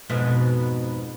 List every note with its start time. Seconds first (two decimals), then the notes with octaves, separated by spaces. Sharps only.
0.09 F2 G#2 B2